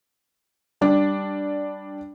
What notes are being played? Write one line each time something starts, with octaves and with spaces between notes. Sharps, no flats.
G3 D4